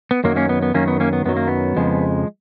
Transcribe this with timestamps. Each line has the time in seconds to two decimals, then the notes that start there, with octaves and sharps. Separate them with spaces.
0.11 B3
0.24 F#2 D#3 F#3 A#3
0.36 A#3 C#4
0.49 B3
0.63 B3
0.74 F#2 D#3 F#3 A#3 C#4
0.88 B3
1.00 A#3 C#4
1.13 B3
1.25 F#2 D#3 F#3 B3
1.37 A#3
1.48 B3
1.77 F2 C#3 F3 G#3